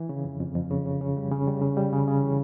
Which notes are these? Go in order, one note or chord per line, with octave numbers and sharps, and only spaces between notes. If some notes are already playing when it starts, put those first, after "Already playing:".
Already playing: E3
C#3
F2
F2
F2
C#3
C#3
C#3
G3
C#3
G3
C#3
G3
C#3
C#3
E3